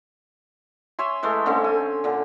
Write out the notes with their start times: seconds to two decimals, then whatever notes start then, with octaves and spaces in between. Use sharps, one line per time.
0.99 C#5 E5 G#5 C6
1.23 E3 G#3 A3 C6
1.46 D3 A3 C4 C#4
1.64 G#5
2.04 A#2 D3